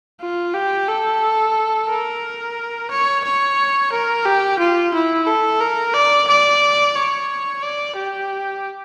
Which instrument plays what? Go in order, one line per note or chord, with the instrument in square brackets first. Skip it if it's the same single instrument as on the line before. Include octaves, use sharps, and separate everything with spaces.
[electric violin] F4
G4
A4
A#4
C#5
C#5
A#4
G4
F4
E4
A4
A#4
D5
D5
C#5
D5
G4